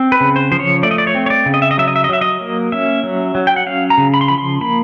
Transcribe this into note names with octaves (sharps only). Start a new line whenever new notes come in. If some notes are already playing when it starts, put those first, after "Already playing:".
Already playing: C4
B4
C#3
C5
F3 C5
C#5
A3 D5
D#5
D5
C#5
C4
C#5
D5
C#3
D#5
E5
D#5
F#3 E5
D#5
E5
D#5
F#3 E5
D#5
A#3
C#4 E5
F#3
F#3
G5
F#5
C#4 F5
A#5
C#3
B5
C6
F3 B5
C6
A#3 B5